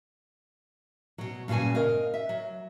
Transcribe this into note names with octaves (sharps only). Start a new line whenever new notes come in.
B2 F#3
G2 A#2 C#3 F#4 G#5
A#4 D#5 F5
E5
F#3